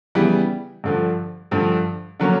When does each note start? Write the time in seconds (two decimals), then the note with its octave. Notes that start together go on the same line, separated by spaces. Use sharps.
0.15 C#3 E3 G3 B3
0.84 G2 D3 F3
1.51 G2 D3 F3
2.20 D3 F#3 A#3 C#4